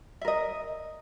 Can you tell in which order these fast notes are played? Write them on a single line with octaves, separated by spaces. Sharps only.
E5 A#4 D#5